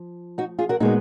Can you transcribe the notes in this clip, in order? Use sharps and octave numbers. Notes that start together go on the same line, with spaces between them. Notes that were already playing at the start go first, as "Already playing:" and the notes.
Already playing: F3
D#4 F#4
F4 G#4
F#4 A#4
A#2 G#3 B3 D#4 F#4